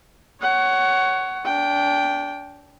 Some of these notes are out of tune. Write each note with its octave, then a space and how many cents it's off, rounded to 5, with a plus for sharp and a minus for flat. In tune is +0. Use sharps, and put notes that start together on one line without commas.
C#5 +0 F#5 +20
D4 -30 G5 +0